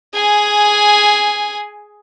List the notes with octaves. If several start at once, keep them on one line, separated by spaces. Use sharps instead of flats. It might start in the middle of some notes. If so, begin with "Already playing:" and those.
G#4 G#5